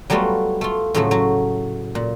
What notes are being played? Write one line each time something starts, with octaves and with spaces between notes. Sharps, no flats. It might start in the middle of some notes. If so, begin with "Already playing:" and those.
F#3 G3 A3 B3 F4
A3 F4
A2 C#3 F3 F#3 A3
F#3
A#2